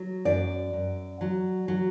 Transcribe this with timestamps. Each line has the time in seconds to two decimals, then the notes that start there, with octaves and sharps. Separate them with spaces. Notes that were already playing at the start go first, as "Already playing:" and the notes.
Already playing: F#3
0.25 F#2 D5
0.73 F#2
1.21 F#3
1.68 F#3